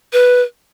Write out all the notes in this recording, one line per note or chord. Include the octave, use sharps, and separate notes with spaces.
B4